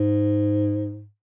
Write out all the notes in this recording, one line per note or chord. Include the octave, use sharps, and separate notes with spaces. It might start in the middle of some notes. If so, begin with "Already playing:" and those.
Already playing: G#2